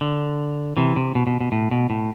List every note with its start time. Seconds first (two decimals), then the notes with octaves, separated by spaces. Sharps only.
0.01 D3
0.77 C3 E3
0.96 C3
1.15 B2
1.27 B2
1.41 B2
1.52 A2
1.71 B2
1.90 A2